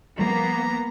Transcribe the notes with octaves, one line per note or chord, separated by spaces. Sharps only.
F3 G3 A#3 B3 A#5